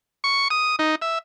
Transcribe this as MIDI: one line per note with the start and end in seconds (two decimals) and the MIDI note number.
0.24 0.48 85
0.50 0.76 87
0.79 0.95 63
1.02 1.19 76